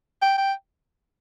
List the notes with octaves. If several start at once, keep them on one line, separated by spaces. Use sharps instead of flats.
G5
G5